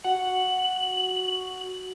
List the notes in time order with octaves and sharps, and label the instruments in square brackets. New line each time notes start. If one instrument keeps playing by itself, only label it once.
[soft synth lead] F#4 [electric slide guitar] F#5 [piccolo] F#7